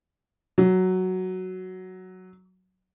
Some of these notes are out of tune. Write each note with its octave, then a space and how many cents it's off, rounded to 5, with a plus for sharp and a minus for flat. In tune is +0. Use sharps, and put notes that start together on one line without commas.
F#3 +5